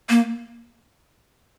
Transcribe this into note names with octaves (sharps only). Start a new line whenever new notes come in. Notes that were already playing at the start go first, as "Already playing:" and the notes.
A#3